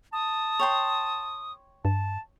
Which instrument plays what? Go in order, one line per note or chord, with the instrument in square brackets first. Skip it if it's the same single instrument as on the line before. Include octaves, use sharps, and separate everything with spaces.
[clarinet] A5 [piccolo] D#6
[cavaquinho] C#5 G5 C6
[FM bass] G2 [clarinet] A5